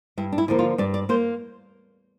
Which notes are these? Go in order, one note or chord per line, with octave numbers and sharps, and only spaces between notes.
G2 E4
D4
E4
D3 F3 A#3
F4
G2 D5
D5
A#3 C5